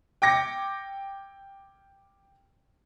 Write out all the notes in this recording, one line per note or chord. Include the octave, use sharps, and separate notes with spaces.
G5 D6 A#6 C#7